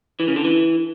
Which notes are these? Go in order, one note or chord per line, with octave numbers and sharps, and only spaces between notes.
E3
C#3
D3
E3